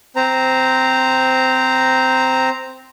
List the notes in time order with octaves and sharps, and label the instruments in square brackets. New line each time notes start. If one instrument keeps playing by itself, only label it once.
[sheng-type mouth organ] C4 C5 A#5